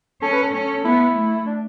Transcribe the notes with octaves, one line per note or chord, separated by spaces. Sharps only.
C#4 A4
B4
A4
C#4
B3 E4
A3
D4